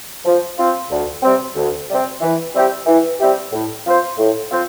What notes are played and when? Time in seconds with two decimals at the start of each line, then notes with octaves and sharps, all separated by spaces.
0.25 F3
0.58 C4 F4
0.90 D2
1.23 C3 G3 C4
1.56 D2
1.88 C3 G3 C4
2.21 E3
2.54 G3 C4 E4 G4
2.86 E3
3.20 G3 C4 E4 G4
3.52 A2
3.85 F3 C4 F4 C5
4.18 A2
4.51 F3 C4 F4 C5